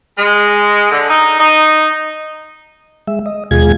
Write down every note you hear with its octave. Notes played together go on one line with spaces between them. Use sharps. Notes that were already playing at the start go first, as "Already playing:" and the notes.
G#3
D3
D#4
D#4
G#3 E5
D#5
D#2 B2 G#3 F4 G#4 G#6